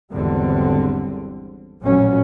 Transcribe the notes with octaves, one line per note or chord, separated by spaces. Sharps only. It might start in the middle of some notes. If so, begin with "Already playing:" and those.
G#1 E2 D3 F#3 G3 C4
A1 F2 A#2 F#3 C#4